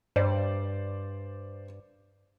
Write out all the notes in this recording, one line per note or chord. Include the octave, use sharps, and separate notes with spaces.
G2 C5 D5